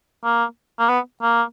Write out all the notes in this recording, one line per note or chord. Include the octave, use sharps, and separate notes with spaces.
A#3
A#3
B3
A#3